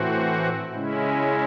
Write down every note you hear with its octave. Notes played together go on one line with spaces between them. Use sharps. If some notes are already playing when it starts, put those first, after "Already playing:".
Already playing: A2 E3 C4 F#4
C#3 G#3 C#4 E4